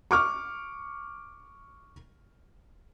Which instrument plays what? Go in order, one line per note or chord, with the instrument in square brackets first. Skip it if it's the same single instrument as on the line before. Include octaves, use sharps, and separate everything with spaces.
[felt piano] C#6 D6 F6